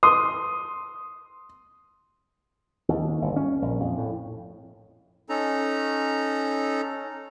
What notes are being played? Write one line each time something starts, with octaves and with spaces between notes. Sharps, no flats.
C6 D#6
D#2
G1
C#4
A#1
F2
A2
C#4 D#4 A4 A#5